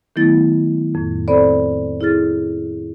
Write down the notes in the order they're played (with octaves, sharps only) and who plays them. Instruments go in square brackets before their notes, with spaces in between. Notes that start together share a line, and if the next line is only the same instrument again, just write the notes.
[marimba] D#3 F#3 A3 B3 E4 A6
F2 A2
C4 A4 C5 D5 B5
E4 G#4 F6 A6